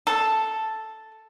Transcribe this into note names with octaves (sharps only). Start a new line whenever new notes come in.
A4